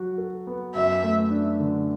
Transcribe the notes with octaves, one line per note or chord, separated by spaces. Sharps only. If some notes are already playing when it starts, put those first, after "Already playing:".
Already playing: F#3 F#4
A4
B3
F#2 E5
A3
D4
D3